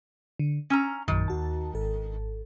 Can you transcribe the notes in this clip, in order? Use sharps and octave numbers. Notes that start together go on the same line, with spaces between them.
D3
C#4 A#5 E6 F6
A#1 F#2 D#3
D#2 F#4 A5
G#1 A4